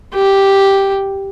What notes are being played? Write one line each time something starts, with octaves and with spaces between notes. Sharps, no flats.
G4